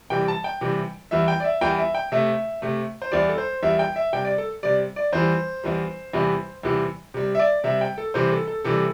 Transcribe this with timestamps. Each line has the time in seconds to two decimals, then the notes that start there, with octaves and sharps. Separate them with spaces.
0.10 C3 E3 G3 G5
0.28 A5
0.44 G5
0.61 C3 E3 G3
1.11 E2 E3 G3 E5
1.28 G5
1.40 D5
1.44 E5
1.61 E2 E3 G3 G5
1.78 E5
1.95 G5
2.12 C3 A3 E5
2.62 C3 A3
3.02 C5
3.12 E2 E3 G3 D5
3.29 A4
3.38 C5
3.63 E2 E3 G3 E5
3.79 G5
3.96 E5
4.13 C3 G3 G5
4.25 D5
4.38 A4
4.63 C3 G3 D5
4.96 D5
5.13 E2 E3 G3 C5
5.64 E2 E3 G3
6.13 E2 C3 E3 G3
6.63 E2 C3 E3 G3
7.14 C3 G3
7.35 E5
7.39 D5
7.64 C3 G3 E5
7.81 G5
7.98 A4
8.14 C3 E3 G3 C5
8.32 A4
8.48 A4
8.64 C3 E3 G3 A4